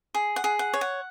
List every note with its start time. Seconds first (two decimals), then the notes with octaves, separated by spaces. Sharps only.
0.15 G#4
0.36 F#5
0.44 G#4
0.59 F#5
0.74 C#5
0.81 F#5